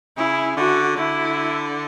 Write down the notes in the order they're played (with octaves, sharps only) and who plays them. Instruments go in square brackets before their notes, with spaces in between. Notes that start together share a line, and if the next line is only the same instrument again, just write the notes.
[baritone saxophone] C#3 [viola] E4
[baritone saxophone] D3 [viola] F#4
[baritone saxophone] D3 [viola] E4